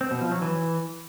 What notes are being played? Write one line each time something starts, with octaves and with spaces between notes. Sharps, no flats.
C4
B2
F3
F#3
E3